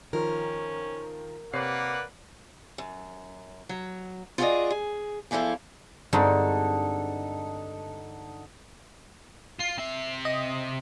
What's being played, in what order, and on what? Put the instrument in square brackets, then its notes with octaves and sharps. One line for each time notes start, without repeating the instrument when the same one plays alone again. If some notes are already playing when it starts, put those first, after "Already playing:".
[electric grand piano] D#3 F3 F4 [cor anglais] C#4 [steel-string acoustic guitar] A#4
[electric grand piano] C3 C#5 C7 [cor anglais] A#3 [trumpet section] B4 D5 F#5
[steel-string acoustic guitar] F#2
F#3
F4 F#4 G#4 A4 D5 D#5
G#4
E2 E3 F3 E4 A4 F5
[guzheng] G2 G#3 C4 [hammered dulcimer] D3 D#4 A4
[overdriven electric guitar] F4 [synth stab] C7
[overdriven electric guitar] C3 E5
[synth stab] D#5